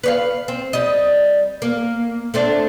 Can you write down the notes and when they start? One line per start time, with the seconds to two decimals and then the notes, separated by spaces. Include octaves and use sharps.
0.04 B4 C#5 F5
0.48 C4
0.73 G3 D#5
1.62 A#3
2.34 A3 C4 D4